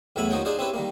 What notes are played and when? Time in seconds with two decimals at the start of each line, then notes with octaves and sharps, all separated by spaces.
0.16 E2 A2 F#3 E5 G#5 B5
0.30 D#2 F3 D#4 F#4 C#5 G5
0.45 D4 D#4 G#4 C5 D5 F5
0.59 C4 C#4 E4 G4 B4
0.74 D#3 G3 A#3